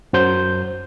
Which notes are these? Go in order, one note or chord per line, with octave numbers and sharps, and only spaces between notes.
F#2 F#3 C5 G6